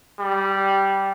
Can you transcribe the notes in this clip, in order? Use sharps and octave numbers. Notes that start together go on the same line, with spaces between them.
G3